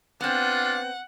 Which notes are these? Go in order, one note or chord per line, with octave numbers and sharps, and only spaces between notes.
B3 C4 D4 F4 F#5